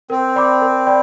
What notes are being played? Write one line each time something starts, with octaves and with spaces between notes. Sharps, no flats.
C4 A#4
D5 G5 B5 D6
A#4
D5 G5 B5